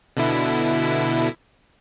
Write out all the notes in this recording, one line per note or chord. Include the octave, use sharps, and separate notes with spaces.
B2 D3 E4